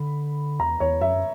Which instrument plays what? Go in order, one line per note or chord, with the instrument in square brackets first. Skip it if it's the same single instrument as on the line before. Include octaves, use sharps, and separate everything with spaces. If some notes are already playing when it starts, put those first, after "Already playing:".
Already playing: [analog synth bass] D3 [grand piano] B5
[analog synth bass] E2 [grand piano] A#5
[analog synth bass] E2 [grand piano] C#5
[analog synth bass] F#2 [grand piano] E5